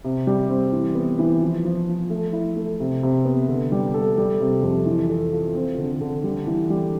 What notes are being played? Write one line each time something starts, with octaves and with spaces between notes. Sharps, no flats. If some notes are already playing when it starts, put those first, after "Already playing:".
C3
G3
C4
E3
B3
E3
F3
F3
F3
A3
E4
A3
C3
C3
B3
D3
G3
A4
G3
C3
F2
E3
A4
F4
C4
D3
D3
G3
E3
G3